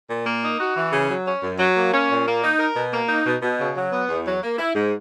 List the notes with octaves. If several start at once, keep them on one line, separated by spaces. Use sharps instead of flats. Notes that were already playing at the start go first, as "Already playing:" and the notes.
A#2
A#3
D#4
F#4
E3
C#3
F#3
C#4
F#2
F#3
A#3
C#4
A#2
A#3
D#4
A#4
B2
A#3
D#4
B2
B2
C#3
F#3
B3
E2
F#3
A#3
E4
G#2